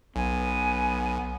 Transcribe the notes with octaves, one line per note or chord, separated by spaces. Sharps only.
B1 B3 G#5